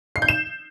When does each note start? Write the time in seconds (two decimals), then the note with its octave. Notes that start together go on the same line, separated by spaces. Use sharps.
0.16 C7
0.22 G6
0.28 E7